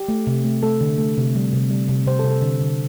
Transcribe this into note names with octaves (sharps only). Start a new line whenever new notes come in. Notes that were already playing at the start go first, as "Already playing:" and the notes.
Already playing: G4
A3
C3
A3
A3 A4
D3
A3
C3
G3
C3
G3
C3
C3 C5
A4
C3
A4
D3
D3